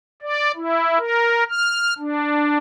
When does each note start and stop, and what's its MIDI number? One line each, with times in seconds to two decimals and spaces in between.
0.22 0.52 74
0.56 0.98 64
0.99 1.44 70
1.50 1.94 89
1.98 2.58 62